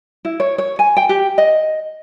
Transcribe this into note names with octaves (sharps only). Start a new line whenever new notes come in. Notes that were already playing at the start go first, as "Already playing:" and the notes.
E4
C#5
C#5
G#5
G5
G4
D#5